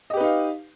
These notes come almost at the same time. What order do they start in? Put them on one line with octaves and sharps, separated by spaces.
D#5 G4 B4 D#4 F5